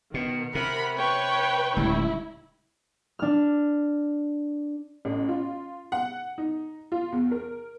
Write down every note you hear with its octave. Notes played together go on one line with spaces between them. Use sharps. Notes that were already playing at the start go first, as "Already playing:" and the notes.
B2 D#3
C3 A#4 F#5 B5
B4 C#5 G5 C#6
D1 C#2 G3 E4
D4 F6
A1
F4
F#5
D#4
F4
E2
A#4